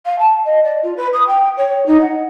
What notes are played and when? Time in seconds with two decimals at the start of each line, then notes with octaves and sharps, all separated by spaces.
0.06 F5
0.19 A5
0.45 D#5
0.63 D5
0.83 F4
0.97 B4
1.13 D#6
1.27 G5
1.57 C#5
1.86 D#4
2.01 F#5